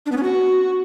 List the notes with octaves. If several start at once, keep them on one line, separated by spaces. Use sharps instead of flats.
D4
B3
C#4
F#4